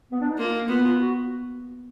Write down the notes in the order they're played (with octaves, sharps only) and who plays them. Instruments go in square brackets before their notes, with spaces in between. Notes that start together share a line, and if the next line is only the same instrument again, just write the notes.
[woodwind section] B3
D4
D#4
[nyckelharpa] A#3 [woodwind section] F4
[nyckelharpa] B3 [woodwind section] F4
[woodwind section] F4
F#4